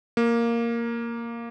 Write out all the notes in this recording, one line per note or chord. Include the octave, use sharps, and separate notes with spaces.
A#3